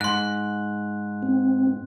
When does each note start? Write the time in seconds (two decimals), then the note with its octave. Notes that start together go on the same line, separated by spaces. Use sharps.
0.01 G#2 C6 F#6
1.23 C4